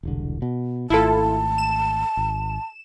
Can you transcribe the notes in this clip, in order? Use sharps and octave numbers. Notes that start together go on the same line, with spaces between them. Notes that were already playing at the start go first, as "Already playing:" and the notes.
E1 C2 D3
B2
G#1 A3 E4 F4 A4 A5
E7
G#1